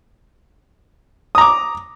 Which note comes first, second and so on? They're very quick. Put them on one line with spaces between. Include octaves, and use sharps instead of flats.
D#6 A#5 D6